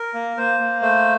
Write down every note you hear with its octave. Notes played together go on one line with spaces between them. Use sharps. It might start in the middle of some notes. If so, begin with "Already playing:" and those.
Already playing: A#4
A#3
A#3 C5
A#3
A3 C5